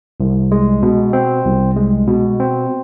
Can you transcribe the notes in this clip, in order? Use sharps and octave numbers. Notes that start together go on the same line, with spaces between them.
C2
G#3
B2
C4
C2
G#3
B2
C4